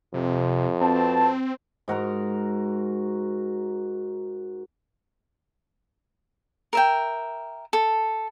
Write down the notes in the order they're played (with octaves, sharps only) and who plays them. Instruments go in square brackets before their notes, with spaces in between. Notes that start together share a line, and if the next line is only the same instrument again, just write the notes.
[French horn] F2 [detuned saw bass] C3
[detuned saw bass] C4 [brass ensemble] F#4 B4 A5
[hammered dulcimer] G#2 F#4 A#4 A#5
[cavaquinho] A#4 E5 G5
A4